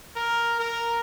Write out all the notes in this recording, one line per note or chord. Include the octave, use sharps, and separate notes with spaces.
A#4
A#4